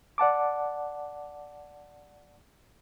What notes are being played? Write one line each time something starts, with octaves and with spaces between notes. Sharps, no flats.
D5 F#5 A5 D6